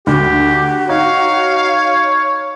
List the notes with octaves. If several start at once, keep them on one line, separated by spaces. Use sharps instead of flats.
D2 F#4 G4
D#4 C#5 F5